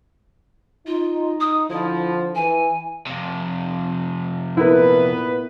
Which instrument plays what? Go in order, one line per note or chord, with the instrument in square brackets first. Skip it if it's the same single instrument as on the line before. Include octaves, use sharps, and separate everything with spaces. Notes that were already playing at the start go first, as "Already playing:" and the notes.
[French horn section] D#4 [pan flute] F4
[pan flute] D#6
[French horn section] D3 F3 [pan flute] E4
[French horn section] E3 [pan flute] G#5
[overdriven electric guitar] F2 C3
[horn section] A#2 B3 B4 [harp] E4 A#4